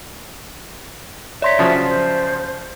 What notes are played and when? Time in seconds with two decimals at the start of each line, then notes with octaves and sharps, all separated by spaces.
1.42 C#5 D5 E5 A#5 C6 B6
1.59 C#3 F3 F#3
1.87 C5